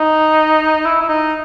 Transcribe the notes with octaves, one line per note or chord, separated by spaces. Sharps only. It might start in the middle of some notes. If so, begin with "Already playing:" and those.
Already playing: D#4
E4
E4
D#4